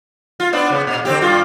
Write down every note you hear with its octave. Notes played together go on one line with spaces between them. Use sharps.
F4
B3 D4
C#3 B3
A#2
D3 C4 G4
G2 F4